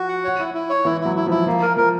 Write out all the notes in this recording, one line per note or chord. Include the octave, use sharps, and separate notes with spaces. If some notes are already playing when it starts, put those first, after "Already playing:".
Already playing: F3 F#4
F#5
C#5
E4
E4
C#5
E3 E4
F#3 E4
E4
F3 E4
F3 A#3
A#4
F3 A#4